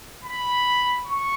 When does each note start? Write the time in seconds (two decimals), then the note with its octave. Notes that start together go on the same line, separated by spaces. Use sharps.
0.24 B5
1.05 C#6